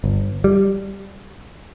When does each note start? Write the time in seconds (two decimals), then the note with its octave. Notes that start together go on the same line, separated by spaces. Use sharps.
0.04 G1
0.44 G3